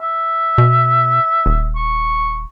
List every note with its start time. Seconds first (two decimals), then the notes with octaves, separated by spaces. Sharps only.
0.01 E5
0.58 B2
1.46 D#1
1.76 C#6